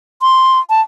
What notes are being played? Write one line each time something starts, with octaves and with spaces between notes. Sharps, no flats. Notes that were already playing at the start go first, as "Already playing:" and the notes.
C6
A5